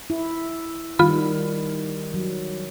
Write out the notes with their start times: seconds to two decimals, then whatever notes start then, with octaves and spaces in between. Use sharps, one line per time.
0.10 E4
0.99 D#3 G3 F4 B5
2.14 F#3